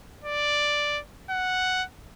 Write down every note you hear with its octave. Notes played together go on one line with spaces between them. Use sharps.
D5
F#5